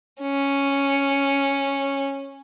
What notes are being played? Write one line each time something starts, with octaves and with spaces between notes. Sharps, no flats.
C#4